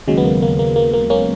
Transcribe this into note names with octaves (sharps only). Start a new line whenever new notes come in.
D#2 C#3 F#3 G#3
B3
A#3
A#3
A#3
A#3
A#3
A#3 C#4